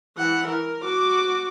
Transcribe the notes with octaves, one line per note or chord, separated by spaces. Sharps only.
E3 F#5
A#4
F#4 D6